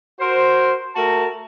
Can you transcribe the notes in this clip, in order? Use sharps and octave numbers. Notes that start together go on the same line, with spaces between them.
F#4 A#4 C5
A3 F#4 A#4 A5